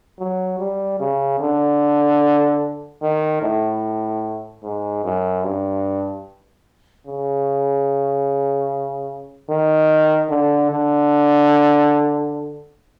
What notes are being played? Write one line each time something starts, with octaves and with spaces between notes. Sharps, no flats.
F#3
G3
C#3
D3
D#3
A2
G#2
F#2
G2
C#3
D#3
D3
D3